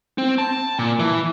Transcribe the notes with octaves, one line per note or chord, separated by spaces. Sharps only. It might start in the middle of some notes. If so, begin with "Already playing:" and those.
C4
A5
A#2
E3